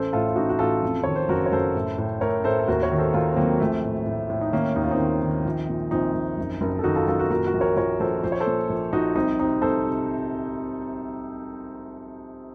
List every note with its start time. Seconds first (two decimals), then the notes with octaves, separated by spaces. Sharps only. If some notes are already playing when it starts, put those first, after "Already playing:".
Already playing: A1 A4 C5
0.13 A2 F4 A4
0.27 F4
0.36 A1 D#4 F#4
0.49 F#4
0.59 A1 F4 A4
0.83 F2
1.03 D#3 C#5
1.16 C5
1.29 F#1 F#4 A#4
1.46 C#5
1.52 F#1 A4 C5
1.75 A2
1.98 A2
2.21 A2 A#4 C#5
2.44 A2 A4 C5
2.59 A4
2.68 D#2 F#4 A#4
2.83 A#4 C#5
2.91 D#3
2.98 A4 C5
3.14 D#2 F4 A4
3.32 C4
3.37 D#3 F#3 A#3
3.60 A#1 A3 C4
3.84 A2
4.06 A2
4.30 A2
4.41 D#4
4.52 D#3 A#3 C#4
4.76 D#2 D#4
4.84 F4
4.91 C4 D#4
4.99 D#3
5.22 D#3
5.45 A#1
5.69 A#2
5.91 A#1 C4 D#4
6.15 A#1
6.38 F#1
6.61 F#1
6.79 A4
6.84 D#3 D#4 F#4
6.96 F4 A4
7.07 F#1 F4 A4
7.19 F#4 A#4
7.30 A#2 F#4 A#4
7.47 F#4 A#4
7.54 A#1
7.61 A#4 C#5
7.76 A#1 A#4 C#5
8.00 A#1 A4 C5
8.24 A#1 C5
8.32 C#5
8.40 A4 C5
8.47 A#2
8.70 A#1
8.92 A#1 D#4 F#4
9.15 C2 C4 D#4
9.39 C3 C4 D#4
9.62 C2 A4 C5
9.85 C3